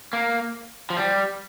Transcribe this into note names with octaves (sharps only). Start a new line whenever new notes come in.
A#3
F3
G3